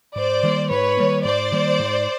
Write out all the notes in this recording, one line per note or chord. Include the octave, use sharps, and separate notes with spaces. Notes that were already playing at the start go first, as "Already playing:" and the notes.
G#2 C5 D5
D#3 G3 A#3
G#2 B4 C#5
D#3 G3 A#3
G#2 C5 D5
D#3 G3 A#3
G#2